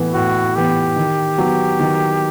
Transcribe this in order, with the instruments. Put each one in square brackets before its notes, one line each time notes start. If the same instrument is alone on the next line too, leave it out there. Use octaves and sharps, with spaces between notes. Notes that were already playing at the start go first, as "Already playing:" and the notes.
Already playing: [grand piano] A2 E3 B3
[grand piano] A2 [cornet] F#4
[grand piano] E3 B3 [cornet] G4
[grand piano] D#3
F#3 B3
D#3